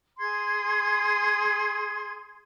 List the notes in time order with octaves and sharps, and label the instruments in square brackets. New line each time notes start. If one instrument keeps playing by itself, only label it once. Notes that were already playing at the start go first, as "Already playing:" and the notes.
[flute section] G#4 C6 G#6